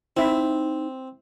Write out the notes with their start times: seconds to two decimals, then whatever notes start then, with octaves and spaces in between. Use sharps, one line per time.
0.17 C4 D#4 E4 E5